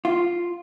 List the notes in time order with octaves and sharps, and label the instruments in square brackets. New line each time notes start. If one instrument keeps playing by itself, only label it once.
[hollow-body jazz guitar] F4